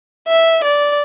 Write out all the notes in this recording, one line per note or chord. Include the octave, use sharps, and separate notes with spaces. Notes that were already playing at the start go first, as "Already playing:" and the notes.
E5
D5